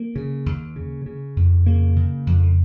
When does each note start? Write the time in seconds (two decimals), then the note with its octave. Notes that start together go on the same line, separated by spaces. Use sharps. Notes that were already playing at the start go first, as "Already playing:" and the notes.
Already playing: A#3
0.16 C#3
0.46 D#2
0.76 C#3
1.06 C#3
1.36 F2
1.66 C#3 A#3
1.96 C#3
2.27 F2